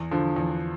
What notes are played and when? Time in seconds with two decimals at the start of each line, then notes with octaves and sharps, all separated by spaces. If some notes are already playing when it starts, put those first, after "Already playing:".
Already playing: E2
0.11 D3 F3
0.36 E2